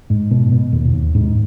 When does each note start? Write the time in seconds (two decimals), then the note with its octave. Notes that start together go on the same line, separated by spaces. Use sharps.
0.10 G#2
0.31 B2
0.52 B2
0.72 D#2
0.93 D#2
1.15 G#2